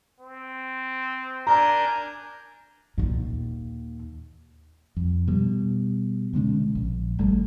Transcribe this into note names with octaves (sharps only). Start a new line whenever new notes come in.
C4
D4 A#4 G#5 A#5 G6
D#2 A#2
F2
B2 G3
B2 D3 G#3 C#4
A#1
G#1 G3 A3